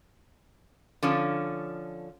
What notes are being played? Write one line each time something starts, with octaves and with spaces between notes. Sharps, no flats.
D3 F3 C#4